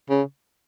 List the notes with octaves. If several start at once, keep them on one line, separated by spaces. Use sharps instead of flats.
C#3